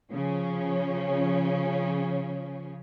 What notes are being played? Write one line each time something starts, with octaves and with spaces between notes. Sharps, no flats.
C#3 F3 C#4